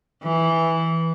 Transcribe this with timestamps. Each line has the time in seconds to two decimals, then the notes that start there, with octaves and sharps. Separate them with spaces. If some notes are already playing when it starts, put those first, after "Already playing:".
0.23 E3